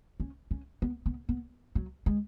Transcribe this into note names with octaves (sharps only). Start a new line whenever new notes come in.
C#4
C#4
B3
B3
B3
F#3
G#3